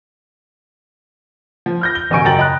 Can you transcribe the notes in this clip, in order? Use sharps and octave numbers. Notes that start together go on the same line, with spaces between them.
F3
F6 G6 A#6
G7
E1 A1 D2 G#5 C#6 D7
F#2 C#3 G5 A#5 A6 F#7
D#5 A#5 B5 F#6